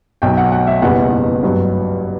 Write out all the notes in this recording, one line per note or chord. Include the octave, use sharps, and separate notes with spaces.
B1 B2 F#3 G5
F#5
F#5
E5
F#1 E2 B2 G3 B3 F#5
G2 F#3 B3